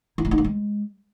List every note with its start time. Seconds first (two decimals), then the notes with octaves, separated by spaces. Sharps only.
0.18 E4
0.25 A3
0.31 D#4
0.38 A#3
0.44 G#3